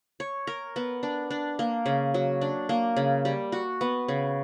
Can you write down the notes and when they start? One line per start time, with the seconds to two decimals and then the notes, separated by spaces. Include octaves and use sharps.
0.20 C#5
0.47 A#4
0.76 B3
1.03 D4
1.31 D4
1.59 A#3
1.86 C#3
2.14 F#3
2.41 D4
2.69 A#3
2.96 C#3
3.25 G3
3.52 F#4
3.81 B3
4.08 C#3